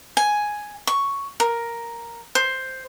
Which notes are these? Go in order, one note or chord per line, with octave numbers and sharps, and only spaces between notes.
G#5
C#6
A#4
C5